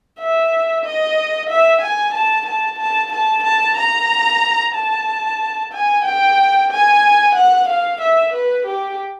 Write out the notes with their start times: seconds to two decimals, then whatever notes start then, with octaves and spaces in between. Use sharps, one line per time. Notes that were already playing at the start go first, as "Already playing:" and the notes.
0.20 E5
0.85 D#5
1.50 E5
1.82 G#5
2.14 A5
2.47 A5
2.79 A5
3.12 A5
3.44 A5
3.77 A#5
4.75 A5
5.73 G#5
6.05 G5
6.71 G#5
7.35 F#5
7.69 F5
8.01 E5
8.33 B4
8.66 G4